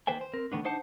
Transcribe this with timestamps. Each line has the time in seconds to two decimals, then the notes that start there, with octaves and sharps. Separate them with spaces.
0.07 D#3 A#3 B4 C5 G5 G#5
0.21 C5
0.34 C4 A#4
0.52 D#3 A3 B3 D4
0.64 D4 D#4 C5 F#5 A5